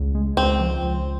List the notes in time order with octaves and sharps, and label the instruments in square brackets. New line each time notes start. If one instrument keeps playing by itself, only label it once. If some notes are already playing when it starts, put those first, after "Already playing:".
Already playing: [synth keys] C#2
G#3
[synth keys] C#2 [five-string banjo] C4
[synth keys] F3
C#2